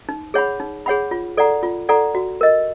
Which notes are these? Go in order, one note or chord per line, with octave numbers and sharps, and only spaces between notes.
D#4
G#4 C#5 F#5 B5
D#4
G#4 C#5 F#5 B5
F4
A4 D5 F#5 A#5
F4
A4 D5 F#5 A#5
F#4
A#4 D#5